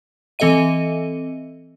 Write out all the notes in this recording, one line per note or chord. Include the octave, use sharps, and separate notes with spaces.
E3 C4 A4 D#5 E5 D#7